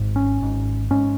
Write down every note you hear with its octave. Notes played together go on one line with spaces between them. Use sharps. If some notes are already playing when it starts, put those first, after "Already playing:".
Already playing: G#1 G#2
C#4
G#1 G#2
G#2 C#4